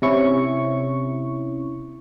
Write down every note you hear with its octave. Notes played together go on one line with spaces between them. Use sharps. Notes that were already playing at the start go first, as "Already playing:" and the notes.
C3 C#4 E4 C#6